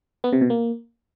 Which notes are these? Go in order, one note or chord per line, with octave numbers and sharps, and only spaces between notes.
B3
C3
B2
A#3